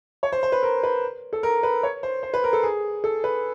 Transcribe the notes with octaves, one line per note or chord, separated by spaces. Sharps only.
C#5
C5
C5
B4
A#4
B4
A4
A#4
B4
C#5
C5
C5
B4
A#4
A4
G#4
A4
B4